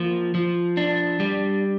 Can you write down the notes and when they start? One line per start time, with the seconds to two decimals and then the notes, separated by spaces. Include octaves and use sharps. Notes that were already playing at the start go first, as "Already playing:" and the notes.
Already playing: F3 A#3
0.35 F3
0.77 D4
1.20 G3